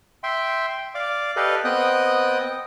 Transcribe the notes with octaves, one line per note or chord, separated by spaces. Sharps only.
E5 G5 C6
D5 F5 D6
G4 A4 B4 D5 D#5 F5
B3 C4 D#5 G5 D#6 F#6